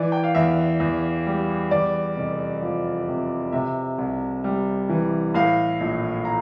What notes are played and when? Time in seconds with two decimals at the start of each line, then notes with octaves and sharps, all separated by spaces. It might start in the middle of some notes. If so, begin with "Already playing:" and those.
Already playing: E3 D5
0.12 G5
0.24 F5
0.35 E2 E5
0.80 E2
1.27 G3
1.71 E2 D5
2.17 F1
2.62 F3
3.08 C3
3.52 C3 E5
3.98 C2
4.44 G3
4.89 E3
5.34 A2 F5
5.80 A#1
6.25 A#5